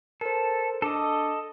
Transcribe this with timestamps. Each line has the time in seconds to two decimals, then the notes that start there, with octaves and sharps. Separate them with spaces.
0.21 A4 A#4 C5
0.82 D4 A4 D#5 D6